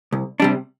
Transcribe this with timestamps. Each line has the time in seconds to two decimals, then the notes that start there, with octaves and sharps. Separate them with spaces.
0.13 C2
0.40 C3 G3 D4